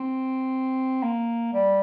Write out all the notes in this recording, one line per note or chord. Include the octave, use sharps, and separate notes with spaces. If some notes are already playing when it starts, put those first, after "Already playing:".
Already playing: C4
A#3
G3